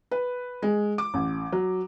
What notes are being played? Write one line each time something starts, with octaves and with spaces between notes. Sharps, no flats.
B4
G#3
D6
A1
F#3